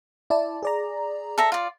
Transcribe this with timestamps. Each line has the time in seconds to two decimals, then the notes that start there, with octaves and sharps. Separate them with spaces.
0.30 E4 D5 A5
0.63 G#4 D5 A#5
1.38 A4 E5 A#5
1.52 F4 D5